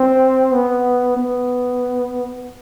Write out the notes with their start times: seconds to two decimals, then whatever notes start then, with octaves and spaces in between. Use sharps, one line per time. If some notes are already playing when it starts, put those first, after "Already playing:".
Already playing: C4
0.53 B3
1.17 B3